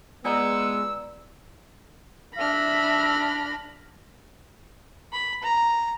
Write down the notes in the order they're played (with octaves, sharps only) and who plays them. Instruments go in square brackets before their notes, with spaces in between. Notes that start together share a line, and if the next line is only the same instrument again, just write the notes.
[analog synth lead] G#3 [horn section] B3 [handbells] F4 D5 A#5 [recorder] E6
[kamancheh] D4 F6 [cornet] E5 [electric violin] B5 A#6
[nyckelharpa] B5
A#5